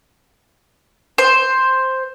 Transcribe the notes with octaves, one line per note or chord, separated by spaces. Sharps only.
C5